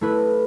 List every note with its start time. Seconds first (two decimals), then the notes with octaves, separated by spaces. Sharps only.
0.01 A3 E4 B4